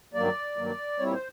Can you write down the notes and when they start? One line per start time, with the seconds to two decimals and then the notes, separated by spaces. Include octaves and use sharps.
0.14 G2 D#3 F#3 A#3 D5
0.56 G2 D#3 F#3 A#3
0.99 A#2 G3 C4 E4 C#5
1.13 C5